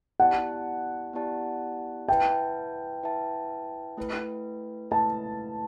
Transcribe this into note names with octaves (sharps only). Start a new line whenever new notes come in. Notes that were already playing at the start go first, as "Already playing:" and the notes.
B3 E4 G4 D5 F#5 A5
B3 E4 G4 D5 A5
E4 B4 E5 G5 A5
E4 B4 E5 A5
A3 E4 B4
A3 E4 B4 A5